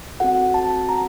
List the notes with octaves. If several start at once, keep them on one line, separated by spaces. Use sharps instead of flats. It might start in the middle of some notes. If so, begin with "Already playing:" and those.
C4 F#4 A4 F#5
A5
A#5